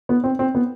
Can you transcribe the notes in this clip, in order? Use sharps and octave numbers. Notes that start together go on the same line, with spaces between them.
B3
C4
C4
B3